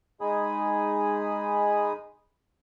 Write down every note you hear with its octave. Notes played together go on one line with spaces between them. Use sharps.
G#3 D#4 G#4 G#5 B5 D#6